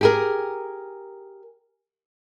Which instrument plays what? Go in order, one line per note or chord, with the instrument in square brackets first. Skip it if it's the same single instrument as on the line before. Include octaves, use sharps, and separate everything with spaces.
[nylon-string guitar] G4 G#4 A#4